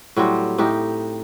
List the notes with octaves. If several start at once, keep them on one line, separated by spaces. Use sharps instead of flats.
A2 F#3 G3 C4
A2 D#4 G4